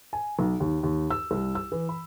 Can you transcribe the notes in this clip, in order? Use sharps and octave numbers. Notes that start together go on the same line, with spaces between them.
G#5
B1
D#2
D#2
E6
C2
E6
E3
B5